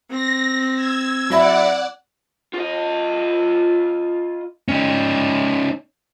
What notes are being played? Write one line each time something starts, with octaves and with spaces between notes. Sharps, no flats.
C4 A#6
E6 G#6
F#3 E4 D5 F#5 B5
F4 D#5
C#4 D#4